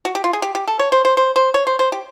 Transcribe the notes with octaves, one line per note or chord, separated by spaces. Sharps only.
F#4
G4
F4
G#4
G4
G4
A4
C#5
C5
C5
C5
C5
C#5
C5
C5
G4